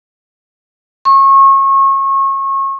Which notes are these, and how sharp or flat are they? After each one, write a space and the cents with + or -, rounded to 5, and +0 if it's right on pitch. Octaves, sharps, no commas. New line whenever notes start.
C#6 -30